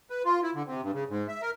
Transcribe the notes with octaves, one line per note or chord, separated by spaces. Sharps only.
B4
F4
E4
D3
C3
G2
C#3
G#2
E5
A#4